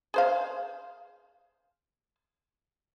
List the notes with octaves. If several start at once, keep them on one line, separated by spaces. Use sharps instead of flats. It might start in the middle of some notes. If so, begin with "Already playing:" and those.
G#4 C5 F5